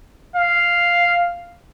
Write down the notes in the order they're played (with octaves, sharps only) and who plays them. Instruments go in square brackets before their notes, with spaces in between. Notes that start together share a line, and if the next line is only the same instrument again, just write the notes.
[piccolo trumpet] F5